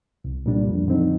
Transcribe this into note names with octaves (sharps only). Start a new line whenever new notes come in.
C2
A#2 G3 D4
F2
D3 F3 C4 D#4